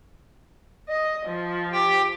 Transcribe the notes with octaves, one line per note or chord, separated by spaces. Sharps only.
D#5
F3
G4 G5